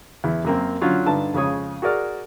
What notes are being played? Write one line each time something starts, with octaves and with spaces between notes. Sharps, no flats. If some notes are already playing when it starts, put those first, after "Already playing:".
E2 E4
F#2 A#3 C4
D3 F#3 C#4 F4
G2 D3 D#4 A5
F2 C#3 G#3 G#4 C#5 D#6
F#4 G#4 A#4 D5 F6